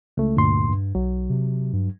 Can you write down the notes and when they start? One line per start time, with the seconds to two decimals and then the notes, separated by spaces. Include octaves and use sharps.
0.17 C#2 A3
0.37 D2 G2 A#2 C6
0.68 G2
0.95 B1 F#3
1.29 C3
1.73 G2